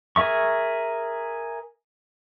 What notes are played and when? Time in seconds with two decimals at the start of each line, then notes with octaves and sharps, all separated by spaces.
0.16 G#4 A#4 E5 C#6